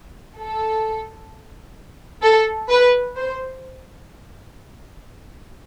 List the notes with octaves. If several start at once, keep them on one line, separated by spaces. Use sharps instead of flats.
A4
A4
B4
C5